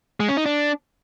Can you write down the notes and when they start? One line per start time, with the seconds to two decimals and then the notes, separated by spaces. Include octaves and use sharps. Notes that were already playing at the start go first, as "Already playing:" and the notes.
0.20 G#3
0.29 C#4
0.37 D#4
0.46 D4